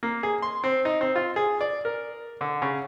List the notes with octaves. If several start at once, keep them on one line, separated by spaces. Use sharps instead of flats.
A#3
G#4
C6
C4
D#4
C4
F4
G#4
D5
A#4
D3
C#3